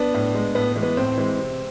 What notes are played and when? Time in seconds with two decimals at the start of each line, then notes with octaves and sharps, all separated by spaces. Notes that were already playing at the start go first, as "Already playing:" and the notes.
Already playing: B3 D4
0.14 A2
0.34 G#3
0.55 A2 B3
0.76 E3 G#3
0.83 B3
0.97 A2 C4
1.18 E3 G#3
1.39 C3